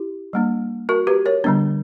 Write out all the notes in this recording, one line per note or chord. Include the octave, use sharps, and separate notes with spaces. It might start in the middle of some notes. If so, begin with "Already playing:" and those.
Already playing: E4 G4
G3 A#3 D4
F#4 A#4
G4 B4
A#4 C#5
D3 G3 B3 D4